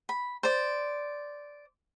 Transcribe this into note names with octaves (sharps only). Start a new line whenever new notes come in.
B5
C5 D5